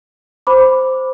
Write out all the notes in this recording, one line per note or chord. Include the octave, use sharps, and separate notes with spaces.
C5 B5 D6